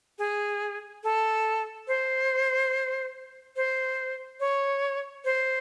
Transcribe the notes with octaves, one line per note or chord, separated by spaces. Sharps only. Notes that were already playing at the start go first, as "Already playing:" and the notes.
G#4
A4
C5
C5
C#5
C5